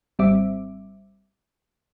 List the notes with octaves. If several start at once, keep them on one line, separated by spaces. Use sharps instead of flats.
G#1 G3 C4 E5 D6